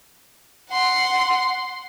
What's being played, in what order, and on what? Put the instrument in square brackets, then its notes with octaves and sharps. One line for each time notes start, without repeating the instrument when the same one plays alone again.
[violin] F#5 C6